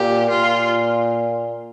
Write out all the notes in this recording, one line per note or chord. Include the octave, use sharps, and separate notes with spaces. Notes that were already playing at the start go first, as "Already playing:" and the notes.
Already playing: A#2 G4
A#2 F4